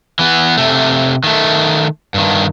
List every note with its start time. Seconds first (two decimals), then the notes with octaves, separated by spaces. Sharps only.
0.19 E3 B3
0.57 C3 A3
1.24 D#3 A3
2.14 G2 D#3